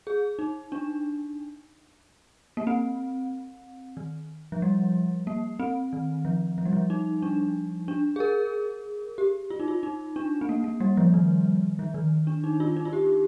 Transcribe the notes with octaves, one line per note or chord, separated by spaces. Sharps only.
G#4
D#4
D4
A#3
C4
D#3
F3
G3
A#3
C4
D#3
F3
F3
G3
F3
D#4
D4
D4
G#4
A#4
G4
F4
D#4
F4
D#4
D4
C4
A#3
A#3
G3
F3
D#3
F3
D#3
D4
D#4
F4
D#4
F4
G4